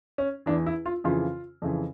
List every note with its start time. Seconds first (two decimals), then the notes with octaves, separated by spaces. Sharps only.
0.18 C#4
0.46 E2 E3 D4
0.66 E4
0.86 F4
1.04 F2 C#3 E3 F4
1.62 F2 C#3 E3